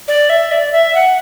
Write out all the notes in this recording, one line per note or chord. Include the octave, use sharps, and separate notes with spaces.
D5
E5
D5
E5
F#5